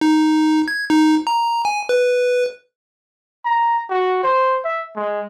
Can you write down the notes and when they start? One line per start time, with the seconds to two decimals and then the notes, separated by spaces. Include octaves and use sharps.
0.01 D#4
0.68 G#6
0.90 D#4
1.27 A#5
1.65 G#5
1.89 B4
3.45 A#5
3.90 F#4
4.23 C5
4.65 E5
4.96 G#3